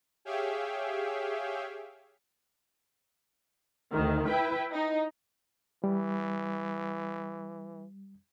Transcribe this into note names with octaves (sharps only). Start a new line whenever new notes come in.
G4 G#4 C#5 E5 F5 G5
D2 D#3
E4 B4 G5
D#4
E3 G3